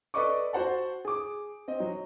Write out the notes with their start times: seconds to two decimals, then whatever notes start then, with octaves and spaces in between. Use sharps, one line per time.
0.14 A4 B4 D5 D#5 C#6 D6
0.53 F#4 C5 F#5 A5
1.05 G#4 D6
1.68 C4 D#5
1.80 F#3